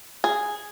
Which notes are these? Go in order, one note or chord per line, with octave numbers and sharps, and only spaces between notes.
G#4